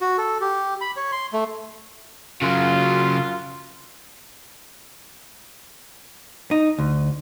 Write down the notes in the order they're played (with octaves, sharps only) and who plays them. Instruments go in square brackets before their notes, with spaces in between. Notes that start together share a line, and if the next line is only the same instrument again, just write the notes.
[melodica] F#4
A4
G4
B5
C#5
C6
A3
[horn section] F#2 F4 [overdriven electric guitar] C#3 F#3
[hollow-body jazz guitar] D#4
D2